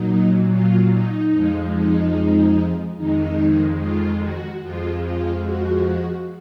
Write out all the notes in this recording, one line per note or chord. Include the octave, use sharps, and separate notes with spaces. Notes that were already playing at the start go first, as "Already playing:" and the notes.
Already playing: A#2 F#3 D#4
F4
D#4
F2 F3 G#3
D#4
F2 D#3 G#3 D#4
F4
F#4
F2 F3 G#3 F4
F4
F#4